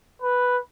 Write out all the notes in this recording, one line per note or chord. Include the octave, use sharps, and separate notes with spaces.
B4